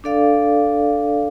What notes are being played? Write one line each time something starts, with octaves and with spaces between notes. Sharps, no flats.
D4 A4 D5 F5